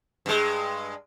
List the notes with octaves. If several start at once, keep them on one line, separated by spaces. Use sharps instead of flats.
G2 G#3